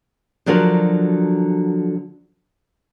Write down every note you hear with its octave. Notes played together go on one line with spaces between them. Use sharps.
D3 F3 F#3 D4 F#4 A#4